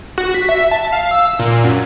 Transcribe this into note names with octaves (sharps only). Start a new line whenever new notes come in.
F#4
B6
E5
A5
F5
E6
A#2
F#2